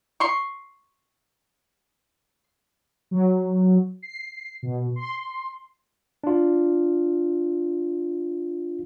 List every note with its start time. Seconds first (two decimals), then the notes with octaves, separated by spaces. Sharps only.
0.20 C6 C#6
3.11 F#3
4.02 C7
4.63 B2
4.96 C6
6.24 D4 F4